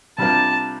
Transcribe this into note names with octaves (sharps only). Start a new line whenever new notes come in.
C3 G3 D4 F4 A#4 A5